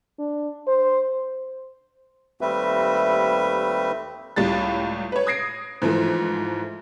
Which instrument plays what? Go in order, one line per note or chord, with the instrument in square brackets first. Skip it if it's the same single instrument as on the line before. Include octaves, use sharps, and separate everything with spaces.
[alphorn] D4
C5
[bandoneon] D#2 G3 A3 C4 B4 E5
[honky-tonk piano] C#2 A2 G3 F4 A6
B4 C#5
D#6 G#6 A#6 C7 D7
G#2 E3 F3 A3